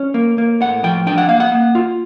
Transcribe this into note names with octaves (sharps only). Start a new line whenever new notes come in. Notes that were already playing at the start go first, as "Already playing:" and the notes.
Already playing: C#4
A#3
A#3
A2 F#5
F3 G5
D4 G5
F#5
A#3 F5
F#5
A#3
F4